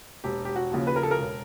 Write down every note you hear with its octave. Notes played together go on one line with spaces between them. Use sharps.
E1 G4
G4
F#4
D#2 C#3 F3
B4
A#4
A4
A#4
E1